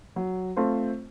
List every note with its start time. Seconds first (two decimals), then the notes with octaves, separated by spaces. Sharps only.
0.16 F#3
0.56 A3 C4 F4 C5